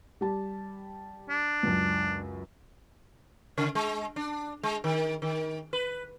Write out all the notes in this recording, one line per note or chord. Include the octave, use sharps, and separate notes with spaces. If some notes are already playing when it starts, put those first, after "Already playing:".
G3 G4 A5
D4
C#2 F#2
C#3
G#3
D4
G#3
D#3
D#3
B4